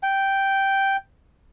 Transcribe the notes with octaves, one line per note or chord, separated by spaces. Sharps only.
G5